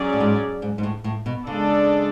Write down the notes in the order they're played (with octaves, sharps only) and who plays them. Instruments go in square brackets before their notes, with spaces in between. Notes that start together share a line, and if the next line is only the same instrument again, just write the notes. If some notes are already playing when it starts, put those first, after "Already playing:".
Already playing: [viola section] F#3 C#4 G#4 D5
[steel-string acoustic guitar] A2
G#2
G#2
G#2
A2
A2
B2
[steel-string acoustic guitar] C#3 [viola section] G#3 D4 A4 D5